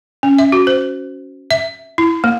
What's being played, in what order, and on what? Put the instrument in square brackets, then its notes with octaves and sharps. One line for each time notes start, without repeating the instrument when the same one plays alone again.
[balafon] C#4
E5
F#4
C5
E5
E4
A#3